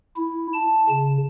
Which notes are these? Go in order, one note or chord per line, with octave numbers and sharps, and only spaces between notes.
E4
A5
C#3